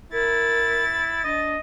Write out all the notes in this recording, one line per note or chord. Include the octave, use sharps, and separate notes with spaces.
E4 A#4 A6
D4 D#5